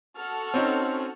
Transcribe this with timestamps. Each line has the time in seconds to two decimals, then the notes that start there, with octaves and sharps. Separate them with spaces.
0.17 F#4 A4 F6
0.54 C4 C#4 D#4